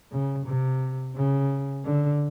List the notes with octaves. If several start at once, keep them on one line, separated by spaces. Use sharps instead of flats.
C#3
C3
C#3
D3